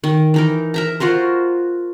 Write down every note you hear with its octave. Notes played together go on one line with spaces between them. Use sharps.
D#3
E3 D#4 A#4
A#4 E5 A#5
F4 F#4 A#4 C5